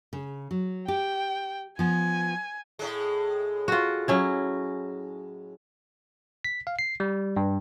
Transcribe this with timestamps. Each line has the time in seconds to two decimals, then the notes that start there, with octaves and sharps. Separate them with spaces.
0.13 C#3
0.51 F#3
0.88 G4 G5
1.79 F3 B3 G#5
2.79 A2 G#3
3.68 F4 F#4
4.08 F#3 C#4 E4
6.44 B6
6.67 F5
6.79 C7
7.00 G3
7.37 G2